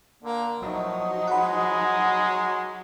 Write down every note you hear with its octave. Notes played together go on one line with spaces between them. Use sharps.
D3 A#3
A2 F3 F#3 D#4
G#3 F#5 B5